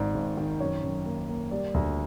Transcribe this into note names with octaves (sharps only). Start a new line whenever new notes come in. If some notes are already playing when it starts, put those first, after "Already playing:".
Already playing: G#1 G#2 D5
G#1
D#3
F#2 C#5
F#2
A#3
A#3
G3 D5
D2